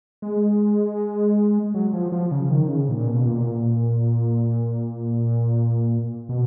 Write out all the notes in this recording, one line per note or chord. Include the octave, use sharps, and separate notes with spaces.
G#3
F#3
F3
F3
C#3
D#3
C#3
A#2
B2
A#2
B2